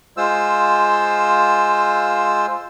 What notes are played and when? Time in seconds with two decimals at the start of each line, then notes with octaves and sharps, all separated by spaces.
0.17 G#3 F4 C5 E6